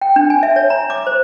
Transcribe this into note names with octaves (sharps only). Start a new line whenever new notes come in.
G5
D4
G#5
E5
C#5
A#5
D6
C5